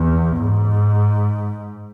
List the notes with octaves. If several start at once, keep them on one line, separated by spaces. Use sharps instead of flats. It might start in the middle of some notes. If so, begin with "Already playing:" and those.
Already playing: E2
G#2